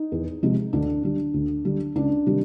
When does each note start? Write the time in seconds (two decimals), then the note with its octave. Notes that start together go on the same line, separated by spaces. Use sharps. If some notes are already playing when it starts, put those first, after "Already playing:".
Already playing: D#4
0.12 E2
0.43 C3 F3 G#3
0.73 D2 D4
1.03 D3 G3
1.34 D2
1.65 D3 G3
1.95 C#2 D4
2.26 C3 D#3 G3